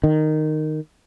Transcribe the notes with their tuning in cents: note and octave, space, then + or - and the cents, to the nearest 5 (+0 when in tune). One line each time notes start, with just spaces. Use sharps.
D#3 -10